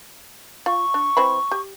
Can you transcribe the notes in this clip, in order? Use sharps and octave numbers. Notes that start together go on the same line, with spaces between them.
F4 C#6
D4
E3 C4 B5
G4